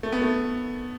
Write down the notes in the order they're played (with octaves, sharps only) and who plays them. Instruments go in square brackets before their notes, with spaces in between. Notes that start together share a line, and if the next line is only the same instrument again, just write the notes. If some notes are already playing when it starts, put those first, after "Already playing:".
[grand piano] A3
B3
A3